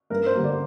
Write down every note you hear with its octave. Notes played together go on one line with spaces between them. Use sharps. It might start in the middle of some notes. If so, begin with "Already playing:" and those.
G2 A#4
C5
D3 G3 A#3
D5